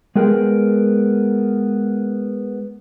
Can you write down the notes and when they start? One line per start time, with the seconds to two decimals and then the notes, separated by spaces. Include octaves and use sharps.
0.16 G#3 B3 G#4 A#4 G5